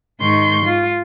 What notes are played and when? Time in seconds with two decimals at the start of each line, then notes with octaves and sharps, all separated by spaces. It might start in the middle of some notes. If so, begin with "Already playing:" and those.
0.21 G#2 D#3 C6 C#6 G6
0.66 F4